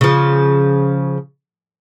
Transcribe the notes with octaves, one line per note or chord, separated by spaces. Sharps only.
C#3 F3